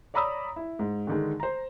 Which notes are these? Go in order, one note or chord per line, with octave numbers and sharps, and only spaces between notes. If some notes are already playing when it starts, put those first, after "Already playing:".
C#5 D5 A#5 B5 D#6 E6
E4
G#2
D3 D#3 G#3
C5 A#5